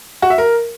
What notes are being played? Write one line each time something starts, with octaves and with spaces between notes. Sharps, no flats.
F#4
E5
A#4